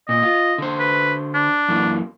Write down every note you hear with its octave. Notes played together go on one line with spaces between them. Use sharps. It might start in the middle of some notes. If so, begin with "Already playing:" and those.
A#2 D#5
F4
D3 C5
B4
D4
F#2 E3 A#3